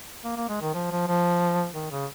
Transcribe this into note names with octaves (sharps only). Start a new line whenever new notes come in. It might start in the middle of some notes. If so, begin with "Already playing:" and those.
A#3
A#3
G#3
D#3
F3
F3
F3
D#3
C#3